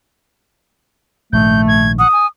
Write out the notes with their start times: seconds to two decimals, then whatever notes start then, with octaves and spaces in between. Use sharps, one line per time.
1.33 A#1 G#2 D#3 A3 G6
1.68 G#6
1.99 F#5 D#6
2.13 G#5